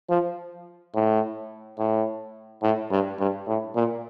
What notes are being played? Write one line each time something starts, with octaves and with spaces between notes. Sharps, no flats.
F3
A2
A2
A2
G2
G2
A2
A#2